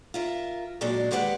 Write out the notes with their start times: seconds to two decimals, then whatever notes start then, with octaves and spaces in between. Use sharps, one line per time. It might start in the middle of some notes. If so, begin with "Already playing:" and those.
0.14 F4 A#4 E5
0.81 A#2 F#3 G#3 D4
1.11 D#2 G#3 G4 B4 E5 F#5